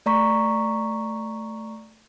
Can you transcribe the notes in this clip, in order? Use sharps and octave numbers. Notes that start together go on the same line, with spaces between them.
A3 D5 A#5 C#6 B6